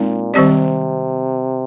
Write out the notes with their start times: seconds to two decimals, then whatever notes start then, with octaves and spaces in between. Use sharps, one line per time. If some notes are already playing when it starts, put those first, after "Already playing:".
Already playing: A#2 G#3 C4 D#4
0.34 C3 D#3 G3 C4 G4 D5